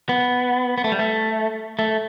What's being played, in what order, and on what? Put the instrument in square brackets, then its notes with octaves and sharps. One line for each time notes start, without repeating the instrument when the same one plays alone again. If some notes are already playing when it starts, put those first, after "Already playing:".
[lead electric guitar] B3
B3
A3
G3
A3
A3